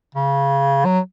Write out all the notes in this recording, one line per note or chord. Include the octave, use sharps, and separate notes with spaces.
C#3
F#3